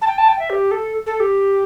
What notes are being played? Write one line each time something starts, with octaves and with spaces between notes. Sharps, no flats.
A5
G5
A5
G5
E5
G4
A4
A4
G4